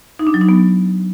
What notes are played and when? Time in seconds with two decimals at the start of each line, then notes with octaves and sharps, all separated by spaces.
0.19 D#4
0.27 D4
0.34 F#3
0.41 D#4
0.49 B3